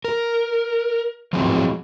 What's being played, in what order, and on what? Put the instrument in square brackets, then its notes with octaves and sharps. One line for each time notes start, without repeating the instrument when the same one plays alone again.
[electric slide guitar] A#4
F3 F#3 G#3 C4 D#4 E4